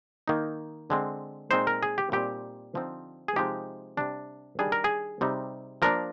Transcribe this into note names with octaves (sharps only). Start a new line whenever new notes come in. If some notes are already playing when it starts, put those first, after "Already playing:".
D#3 A#3 D#4
D3 G#3 C4
A#2 G#3 C4 D#4 C5
A#4
G#4
G4
A#2 G3 C4 D#4 G4
D3 F3 C4 D#4
G#4
C3 F3 G#3 C4 D#4 G4
C3 G3 D4
D#3 G3 D4 G#4
A#4
G#4
C3 G3 C4 D#4
F3 A#3 D4 A#4